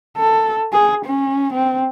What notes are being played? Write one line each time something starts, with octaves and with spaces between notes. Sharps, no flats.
A4
G#4
C#4
C4